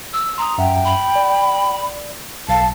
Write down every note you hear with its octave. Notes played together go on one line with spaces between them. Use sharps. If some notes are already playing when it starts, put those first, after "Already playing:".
E6
A#5 C6 D#6
F#2 E5 F#5 G5
B5
D5
B1 F5 A5